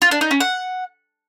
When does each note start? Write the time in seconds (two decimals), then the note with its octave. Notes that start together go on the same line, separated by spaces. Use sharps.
0.02 F4
0.11 D4
0.21 D#4
0.31 C#4
0.40 F#5